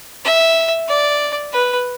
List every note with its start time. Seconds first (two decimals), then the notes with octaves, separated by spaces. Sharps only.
0.25 E5
0.88 D5
1.53 B4